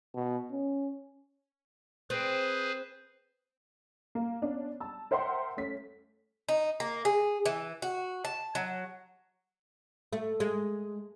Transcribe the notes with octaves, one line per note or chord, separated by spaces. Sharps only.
B2
C#4
C4 G#4 B4 C5
A#3
B3 C#4 D4
A5 E6
A#4 C5 E5 F#5 G5 C6
A3 C#4 B6
D#4
A#3
G#4
E3
F#4
A5
F#3
A3
G#3